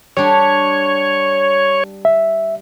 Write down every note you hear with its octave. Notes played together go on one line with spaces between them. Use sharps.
G3 D4 C#5
E5